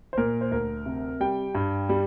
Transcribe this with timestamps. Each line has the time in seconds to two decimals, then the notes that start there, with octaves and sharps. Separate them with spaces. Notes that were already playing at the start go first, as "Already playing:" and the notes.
0.13 C5
0.17 A#2 A#4
0.41 C5
0.51 D2 A#4
0.86 C3
1.20 G3 G5
1.55 G2
1.89 G3